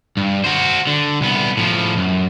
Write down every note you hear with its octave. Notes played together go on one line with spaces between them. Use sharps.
G2
F#4 C5
D3
C2 B3
A2 F3
F#2